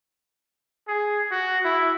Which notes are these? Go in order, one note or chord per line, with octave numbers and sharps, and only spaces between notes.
G#4
F#4
E4